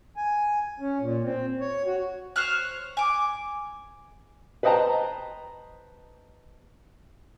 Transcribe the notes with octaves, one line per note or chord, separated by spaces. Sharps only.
G#5
C#4
A#2
C4
C#5
F#4
C5 C#5 F6 F#6
G#5 D6
B4 C5 D#5 G5 A5 A#5